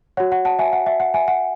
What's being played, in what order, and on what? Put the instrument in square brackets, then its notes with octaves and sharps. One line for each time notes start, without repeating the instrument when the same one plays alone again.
[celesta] F#4 C#5 F#5
F#5
F#5 A5
E5 G#5
F#5
E5
F#5
E5 G#5
F#5